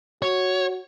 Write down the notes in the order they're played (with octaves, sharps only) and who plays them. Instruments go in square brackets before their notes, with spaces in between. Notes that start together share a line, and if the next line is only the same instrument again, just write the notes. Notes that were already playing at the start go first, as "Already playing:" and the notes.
[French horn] F#4 [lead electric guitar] C#5